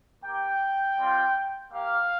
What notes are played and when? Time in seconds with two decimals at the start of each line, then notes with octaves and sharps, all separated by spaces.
0.24 A#3 G4 G5
0.99 G3 C4 F4
1.72 A#3 G4 F5